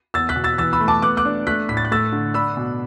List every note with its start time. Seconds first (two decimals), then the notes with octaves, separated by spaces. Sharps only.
0.14 E2 E6 A6
0.29 F#6 B6
0.36 B2
0.44 E6 A6
0.58 E3 E6 A6
0.73 B5 E6
0.81 A3
0.88 A5 D6
1.02 B3 D6 F#6
1.17 D6 F#6
1.25 D4
1.47 A3 F#6 B6
1.69 A2 B6
1.77 A6
1.85 F#6
1.91 A3 E6 A6
2.13 D3
2.34 D4 B5 E6
2.57 B2